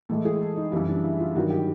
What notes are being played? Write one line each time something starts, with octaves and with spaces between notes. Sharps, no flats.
A2 E3 G#3 A4
G#4
A4
D#4
F#2 C#3 E3 G3 E4
D4
E4
F4
G2 D#3 F#3 F#4
G4